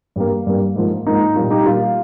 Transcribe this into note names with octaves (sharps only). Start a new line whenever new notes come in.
G2 G3 A#3
G2 G3 A#3
G#2 F3 A#3
G#2 F3 A#3 D#4
A#2 G3 A#3 F4
D#4 G4
A#2 G3 A#3 F4